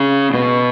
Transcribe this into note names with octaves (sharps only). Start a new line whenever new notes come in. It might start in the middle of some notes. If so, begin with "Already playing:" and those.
Already playing: C#3
B2